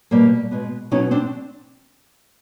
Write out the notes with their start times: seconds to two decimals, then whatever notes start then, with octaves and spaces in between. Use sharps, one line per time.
0.11 B2 G3 A#3
0.51 B2 G#3 B3
0.91 B2 F#3 B3 C#4 D#4
1.11 C4 D4